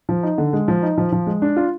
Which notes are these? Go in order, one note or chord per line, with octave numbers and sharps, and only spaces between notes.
F3
D#4
D3
G#3
F3
D#4
F3
F3
G#3
D4
F4